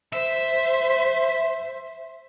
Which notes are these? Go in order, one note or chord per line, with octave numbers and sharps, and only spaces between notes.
C5 E5